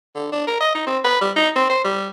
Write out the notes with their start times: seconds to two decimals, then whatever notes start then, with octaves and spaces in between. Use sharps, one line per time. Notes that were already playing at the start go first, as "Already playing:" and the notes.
0.15 D3
0.32 D4
0.47 A#4
0.60 D#5
0.75 D#4
0.86 C4
1.04 B4
1.21 G3
1.36 D#4
1.56 C4
1.69 C5
1.84 G3